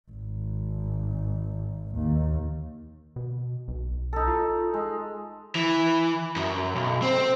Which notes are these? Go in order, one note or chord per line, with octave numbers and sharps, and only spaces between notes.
G#1
D#2
B2
B1
D#4 A4
F4
G#3
E3
F#2
B1
C4